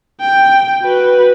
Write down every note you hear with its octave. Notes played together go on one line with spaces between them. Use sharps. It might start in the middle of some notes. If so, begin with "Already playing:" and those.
G5
F#4 B4